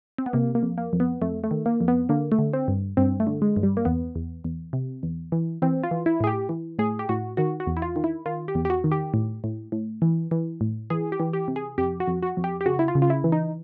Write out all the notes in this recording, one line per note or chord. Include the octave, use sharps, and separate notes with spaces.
C4
B3
C3 A#3
A#3
F2
A#3
F2
B3
F2 A3
A3
D#3
A#3
F2
B3
D3 A#3
A3
D3
C4
G2
G2 C4
A3
D3
G#3
G2
G3
A#3
E2 B3
E2
E2
C3
E2
E3
E3 C4
F4
E3
E4
A2 G#4
G4
E3
A2 G#4
G4
A2 F#4
D#3 F#4
F#4
E2
E4
F4
D#3
E4
D#3 F4
G4
E2
G4
F#4
D#3
G4
A2
A2
A2
E3
E3
A2
E3 G#4
G4
E3
G4
C3
G#4
F2 G4
F#4
F2
F#4
F2
G4
G4
C#3 F#4
E4
F4
C#3
F4
E4
E3
D#4